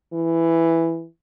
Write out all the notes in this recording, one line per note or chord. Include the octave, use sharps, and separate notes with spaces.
E3